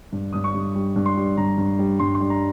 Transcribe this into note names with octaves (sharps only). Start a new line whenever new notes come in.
G2
G2 D#6
C#6
G2
G3
G2
C6
G3
G2 A#5
G2
G3
G2 C6
C6
G3
A#5